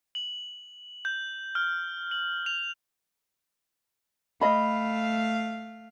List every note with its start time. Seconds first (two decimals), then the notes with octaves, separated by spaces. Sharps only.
0.15 F#7
1.05 G6
1.55 F6
2.11 F#7
2.46 F7
4.41 A3 D#5 F5 B5